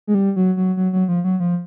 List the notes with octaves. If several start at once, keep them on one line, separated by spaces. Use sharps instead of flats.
G#3
G3
F#3
F#3
F#3
F#3
F3
F#3
F3